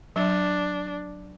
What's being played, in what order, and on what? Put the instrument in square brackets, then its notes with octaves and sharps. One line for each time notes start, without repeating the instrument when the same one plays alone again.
[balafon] F#3 [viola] D4